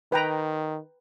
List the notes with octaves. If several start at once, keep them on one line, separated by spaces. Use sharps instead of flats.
D#3 B4 G5 A#5